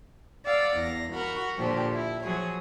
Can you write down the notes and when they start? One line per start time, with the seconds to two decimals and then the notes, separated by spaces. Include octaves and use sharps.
0.46 D5 F5 F#5 E6
0.78 E2 A#6
1.14 F#4 A#4 F#5 B5
1.57 A#2 D3 F3 G4
1.94 E4
2.23 F3 F#3 G#4 C#5